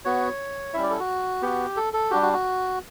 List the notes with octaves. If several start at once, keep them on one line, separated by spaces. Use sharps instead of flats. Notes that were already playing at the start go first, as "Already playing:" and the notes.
B3 F#4 C#5
G3 C#4 E4 E5
D5
A4
F#4
B3 F#4 G4
A4
A4
G3 D4 F#4 G4
F#4
F#4